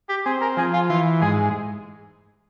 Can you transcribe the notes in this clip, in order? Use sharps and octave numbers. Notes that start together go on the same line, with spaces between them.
G4
C4 G#4
A#4
F3 G#4
F4
E3 F4
G#2 G#4